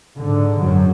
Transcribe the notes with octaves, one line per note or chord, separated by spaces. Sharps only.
G#2 D3
F#2 F#3